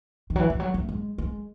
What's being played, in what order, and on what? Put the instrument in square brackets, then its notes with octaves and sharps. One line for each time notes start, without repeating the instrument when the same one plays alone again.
[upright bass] D#3
F#3
E3
E3
F#3
A3
G#3
G#3